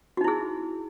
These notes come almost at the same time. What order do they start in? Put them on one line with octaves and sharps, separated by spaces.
F#4 D#4 E4 G#4